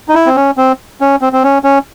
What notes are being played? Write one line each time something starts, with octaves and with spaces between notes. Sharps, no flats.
D#4
E4
C4
C#4
C4
C#4
C4
C4
C#4
C#4